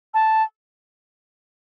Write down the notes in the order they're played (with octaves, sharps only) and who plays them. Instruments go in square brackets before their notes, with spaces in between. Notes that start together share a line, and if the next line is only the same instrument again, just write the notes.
[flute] A5